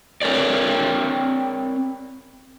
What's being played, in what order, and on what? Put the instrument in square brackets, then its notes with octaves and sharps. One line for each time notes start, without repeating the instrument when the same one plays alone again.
[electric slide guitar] C4 A#4 C#5 D5